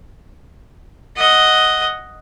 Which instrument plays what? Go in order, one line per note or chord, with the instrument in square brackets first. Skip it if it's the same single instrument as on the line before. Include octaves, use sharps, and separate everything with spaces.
[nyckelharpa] D#5 F#5